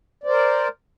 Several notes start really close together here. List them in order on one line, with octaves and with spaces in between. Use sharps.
D5 C5 A#4